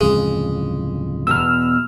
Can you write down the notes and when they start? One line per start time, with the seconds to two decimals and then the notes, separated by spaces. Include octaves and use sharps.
0.01 D1 F2 C#3 G#3
1.27 E2 B2 E6 F6